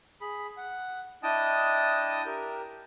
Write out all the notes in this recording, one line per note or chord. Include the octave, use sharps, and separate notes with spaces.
G#4 B5
F#5
D4 E4 D#5 G5 A5 D#6
G4 A#4